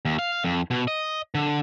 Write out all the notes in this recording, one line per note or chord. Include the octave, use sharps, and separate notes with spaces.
D#2
F5
F2
B2
D#5
D3